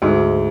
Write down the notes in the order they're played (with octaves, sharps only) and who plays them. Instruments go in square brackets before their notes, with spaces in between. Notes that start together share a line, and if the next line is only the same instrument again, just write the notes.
[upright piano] D2 [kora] G#2